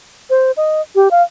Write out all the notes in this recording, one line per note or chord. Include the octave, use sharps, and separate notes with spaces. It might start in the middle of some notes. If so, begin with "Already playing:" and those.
C5
D#5
G4
F5